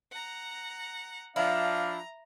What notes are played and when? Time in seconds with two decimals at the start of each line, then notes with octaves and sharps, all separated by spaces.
0.11 F#5 A#5
1.36 F3 D4 E4 F5 A#5